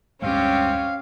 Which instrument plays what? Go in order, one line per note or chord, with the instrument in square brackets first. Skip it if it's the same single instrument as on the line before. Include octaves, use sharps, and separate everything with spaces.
[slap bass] D2 G2 G#3 [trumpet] C4 [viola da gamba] C#4 G4 C#5 [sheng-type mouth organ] F5